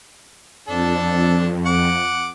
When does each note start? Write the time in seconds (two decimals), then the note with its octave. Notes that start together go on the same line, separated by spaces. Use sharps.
0.68 F2 D4 A4
1.66 F#5 D6